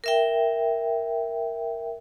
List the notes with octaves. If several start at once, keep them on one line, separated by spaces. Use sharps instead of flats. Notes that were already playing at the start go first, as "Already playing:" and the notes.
A#4 E5 G5